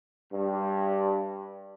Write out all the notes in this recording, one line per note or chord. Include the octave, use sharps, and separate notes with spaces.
G2